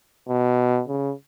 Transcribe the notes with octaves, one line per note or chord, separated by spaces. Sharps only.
B2
C#3